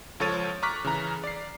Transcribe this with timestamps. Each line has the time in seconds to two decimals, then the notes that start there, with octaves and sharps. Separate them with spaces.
0.20 C#2 F3 A4 C#5 A6 D#7
0.63 A#5 C#6 D6 F6 F#6 B6
0.85 C#3 E3 A#5
1.24 D5 C7